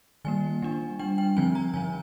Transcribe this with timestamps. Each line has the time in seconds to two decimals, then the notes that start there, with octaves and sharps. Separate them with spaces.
0.25 D#3 G3 A#3 G#5
0.62 G3 D4
0.99 G3 D4 G5
1.18 G5
1.37 D3 F3 C4 G#5
1.55 A#5
1.74 D3 F3 C4 G#5